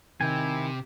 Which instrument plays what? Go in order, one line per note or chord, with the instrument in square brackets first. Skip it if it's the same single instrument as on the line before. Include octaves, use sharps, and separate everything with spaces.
[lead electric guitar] C3 [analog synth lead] D#3 [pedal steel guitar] E4 G5 G#5